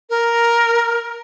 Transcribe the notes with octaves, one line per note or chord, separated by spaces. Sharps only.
A#4